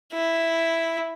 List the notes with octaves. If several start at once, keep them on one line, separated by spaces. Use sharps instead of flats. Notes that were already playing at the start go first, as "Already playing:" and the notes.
E4